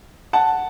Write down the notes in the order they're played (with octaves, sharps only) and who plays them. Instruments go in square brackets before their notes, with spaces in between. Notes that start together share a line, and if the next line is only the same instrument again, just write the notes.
[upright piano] F#5 A5